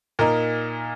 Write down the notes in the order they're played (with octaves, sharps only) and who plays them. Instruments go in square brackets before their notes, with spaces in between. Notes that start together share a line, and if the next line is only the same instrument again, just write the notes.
[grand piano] A#2 A#3 D#4 A#4